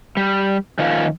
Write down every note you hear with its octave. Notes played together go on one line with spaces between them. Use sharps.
G3
D#3 F3 A#3 C#4 F4